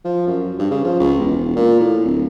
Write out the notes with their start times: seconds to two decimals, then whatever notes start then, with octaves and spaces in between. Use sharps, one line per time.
0.05 F3
0.27 F#2
0.59 G2
0.71 C#3
0.84 F3
1.00 C#2
1.19 E1
1.56 A#2
1.80 A2
2.05 D1